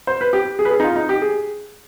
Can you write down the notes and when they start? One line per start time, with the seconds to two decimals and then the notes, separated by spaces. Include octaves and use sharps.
0.07 C5
0.21 B4
0.33 G4
0.59 G#4
0.65 B4
0.71 G#4
0.80 D#4
0.84 F4
0.96 D#4
1.09 G4
1.22 G#4